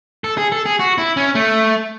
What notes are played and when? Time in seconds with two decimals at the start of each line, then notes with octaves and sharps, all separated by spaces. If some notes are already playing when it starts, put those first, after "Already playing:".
0.24 A4
0.38 G#4
0.52 A4
0.66 G#4
0.79 F#4
0.98 E4
1.17 C#4
1.35 A3